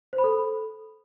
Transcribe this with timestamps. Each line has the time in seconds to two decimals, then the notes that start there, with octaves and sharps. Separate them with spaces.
0.13 C5
0.18 B5
0.24 A4